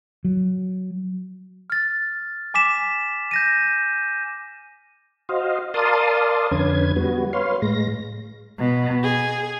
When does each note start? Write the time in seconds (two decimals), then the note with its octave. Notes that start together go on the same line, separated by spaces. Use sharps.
0.24 F#3
1.70 F6 A6
2.54 G#5 D6 B6 E7
3.31 G6 A#6 D#7
5.29 F#4 C5 D#5 F5
5.74 A#4 D5 F5 A5 C6 D#6
6.51 F2 D3 C#4 B4 G#6
6.96 G3 B3 F#4
7.33 B4 C#5 F5 C6
7.62 A2 G#3 A#6
8.59 B2
9.03 G#4